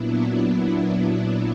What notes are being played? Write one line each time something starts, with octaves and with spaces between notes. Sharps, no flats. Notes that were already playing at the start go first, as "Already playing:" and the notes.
Already playing: A#2 F#3 B3 D4 E4
E4